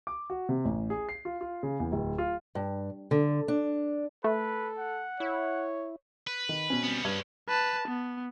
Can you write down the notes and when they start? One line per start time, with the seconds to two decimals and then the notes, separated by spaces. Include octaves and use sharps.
0.07 D6
0.30 F#4
0.49 C3
0.65 A1
0.90 G#4
1.09 C7
1.25 F4
1.41 F4
1.63 C#3
1.80 E2
1.92 D1
2.18 F4
2.55 G2
3.11 D3
3.48 D4
4.24 A3 A4 B4
4.79 F#5
5.20 E4 C#5
6.27 B4
6.49 D#3
6.70 B2 C4 C#4
6.83 G3 B3
7.05 G2 G#3 C#4 G#6
7.49 B4 A5
7.88 B3